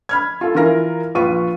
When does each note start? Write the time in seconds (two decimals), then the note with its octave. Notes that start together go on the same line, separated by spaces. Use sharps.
0.09 B5 F6 G#6
0.41 F4 A4
0.55 E3 F4 A#4 A#6
1.15 A#1 F4 B4 C#6 D#7